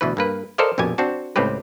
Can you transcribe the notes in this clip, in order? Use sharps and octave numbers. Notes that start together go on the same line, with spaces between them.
D2 B2 E3 B4
G2 A#3 B4
A4 A#4 C5 D5 D#5 F5
A#1 F2 B2 G4 G#5
C4 D4 F#4 A5
C#2 A2 C4 G4 B4